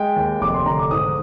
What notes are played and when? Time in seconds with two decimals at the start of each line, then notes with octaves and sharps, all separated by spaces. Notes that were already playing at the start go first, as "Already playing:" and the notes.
Already playing: G#3 G5
0.16 D#2
0.41 F1 D6
0.54 C6
0.66 D3 A#5
0.79 D6
0.91 G#2 D#6